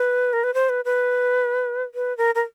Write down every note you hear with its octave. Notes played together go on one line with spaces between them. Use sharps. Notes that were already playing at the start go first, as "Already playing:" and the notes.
Already playing: B4
A#4
B4
C5
B4
B4
B4
A#4
A#4